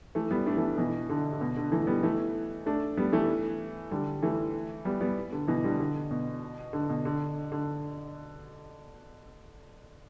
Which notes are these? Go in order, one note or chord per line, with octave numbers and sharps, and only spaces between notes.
E3 A3
G3 B3
A3 D4
E3 A3
B2 E3
D3
D3
B2
D3
E3 A3
G3 B3
E3 A3
A3 D4
G3 B3
E3 A3
D3 G3
E3 A3
G3 B3
G3 B3
D3
B2 E3
D3 G3
D3
B2
D3
B2
D3
D3